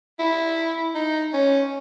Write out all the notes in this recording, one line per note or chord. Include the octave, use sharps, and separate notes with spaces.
E4
D#4
C#4